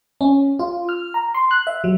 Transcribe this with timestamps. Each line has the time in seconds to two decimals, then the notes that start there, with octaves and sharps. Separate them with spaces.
0.21 C#4
0.59 F4
0.89 F6
1.14 A#5
1.35 C6
1.51 F#6
1.67 E5
1.84 F#3